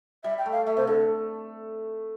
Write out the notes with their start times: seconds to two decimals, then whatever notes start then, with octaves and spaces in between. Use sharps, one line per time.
0.24 G3 E5
0.38 G5
0.46 A3
0.52 F5
0.66 A3 E5
0.77 C3 C5
0.87 D3 A4